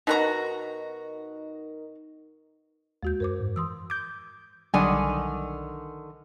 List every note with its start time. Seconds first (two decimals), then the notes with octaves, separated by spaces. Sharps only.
0.07 B2 D#4 F#4 A#4 D#5 A#5
3.03 D#2 G#3 F#4 G6
3.20 F#2 A#4 C5 D6
3.40 G#2
3.56 E3 C6 D#6 E6
3.90 D6 G6
4.74 B1 D3 D#3 G3 F#5 G#5